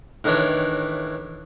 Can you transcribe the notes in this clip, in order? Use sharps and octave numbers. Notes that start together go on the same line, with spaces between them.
A2 D#3 E3 D4 C#5